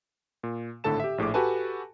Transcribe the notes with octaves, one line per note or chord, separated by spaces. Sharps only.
A#2
G#1 A2 D3 A4 A5 E7
G4 E5
A#1 A2 G#4 D6
F#4 G4 A4 B4 G#5 A5